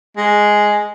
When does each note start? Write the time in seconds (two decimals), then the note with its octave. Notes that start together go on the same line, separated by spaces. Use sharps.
0.18 G#3